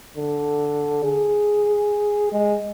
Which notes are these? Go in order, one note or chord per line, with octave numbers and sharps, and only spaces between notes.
D3
G#4
G#3